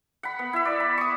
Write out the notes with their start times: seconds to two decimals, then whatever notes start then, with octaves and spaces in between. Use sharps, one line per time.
0.23 F#5 B5
0.39 B3
0.53 E4 E5
0.65 D5
0.80 B5
0.98 C#6 D#6